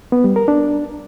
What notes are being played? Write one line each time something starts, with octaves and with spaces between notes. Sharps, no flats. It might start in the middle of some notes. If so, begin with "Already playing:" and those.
B3
G3
A#4
D4